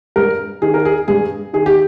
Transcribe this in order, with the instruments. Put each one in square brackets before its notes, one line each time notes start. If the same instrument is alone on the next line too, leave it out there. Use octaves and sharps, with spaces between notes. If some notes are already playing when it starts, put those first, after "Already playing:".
[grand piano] G2 A#4
D#3 G#4
A#4
G#4
G2 G#4
D#3 G#4
G4